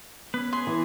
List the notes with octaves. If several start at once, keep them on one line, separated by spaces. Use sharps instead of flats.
B3 C#4 B4
G#4 C6
E3